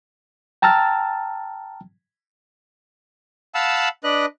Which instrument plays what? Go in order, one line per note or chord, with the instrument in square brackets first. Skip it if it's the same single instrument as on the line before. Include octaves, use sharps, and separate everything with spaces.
[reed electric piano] G5 A5 A#5 E6 F6 A6
[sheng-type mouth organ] F5 F#5 A5 B5 E6
D4 B4 D#5 F#6